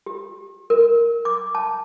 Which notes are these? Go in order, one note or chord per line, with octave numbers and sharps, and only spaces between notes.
G4
A#4
D6
A5